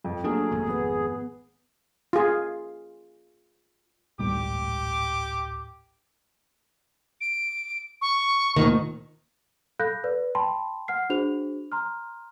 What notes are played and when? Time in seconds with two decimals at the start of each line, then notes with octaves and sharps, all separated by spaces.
0.04 F2
0.24 F#3 A3 A#3 D4 G#4
0.51 G#1 F2
0.68 B3
2.13 F4 G#4
4.19 D1 G#1 G3 G4 D6
7.21 D7
8.01 C#6
8.56 D2 A#2 D#3
9.79 A4 F5 B5 F#6 G6 A#6
10.04 B4 D5
10.35 G5 A5 B5 C6
10.88 F#5 F6 C7
11.10 D4 F#4 G#4 C5 F7
11.72 A#5 C6 F6